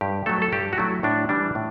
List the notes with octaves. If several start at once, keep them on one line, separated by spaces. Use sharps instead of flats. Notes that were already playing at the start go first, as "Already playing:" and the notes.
G2 G4
F#3 A3 A4
A4
G2 G4
F#4
F#3 A3 E4
A2 D4
E3 G3 D4
A2